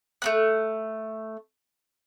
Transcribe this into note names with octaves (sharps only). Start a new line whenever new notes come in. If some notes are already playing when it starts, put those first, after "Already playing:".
A3 A#3 F#6